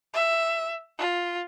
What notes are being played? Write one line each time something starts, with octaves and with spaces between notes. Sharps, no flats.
E5
F4